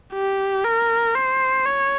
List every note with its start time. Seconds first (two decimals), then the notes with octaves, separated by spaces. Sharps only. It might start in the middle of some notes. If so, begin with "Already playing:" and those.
0.14 G4
0.64 A#4
1.15 C5
1.65 C#5